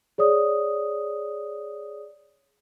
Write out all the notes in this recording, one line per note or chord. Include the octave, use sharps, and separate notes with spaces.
G#4 C#5 D5 D#6